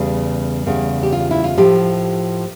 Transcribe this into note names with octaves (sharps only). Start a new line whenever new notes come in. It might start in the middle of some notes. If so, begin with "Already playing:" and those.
Already playing: E2 C#3 G3
E2 C#3 G3
G4
F4
E4
F4
A2 F3 G4